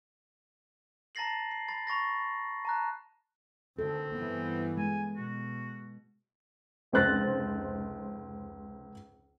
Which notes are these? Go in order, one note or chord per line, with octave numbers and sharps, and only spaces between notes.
A5 A#5 A6 A#6 C7 F#7
C7
B5 A6 C7
B5 C#6 A6 A#6
A5 A#5 F#6
D2 D#3 C4 A4
G2 E3 B3
G#3 G#5
B2 F#4
F1 C#2 C5 F#6 A6 A#6